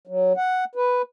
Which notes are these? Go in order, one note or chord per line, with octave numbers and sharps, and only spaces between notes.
F#3
F#5
B4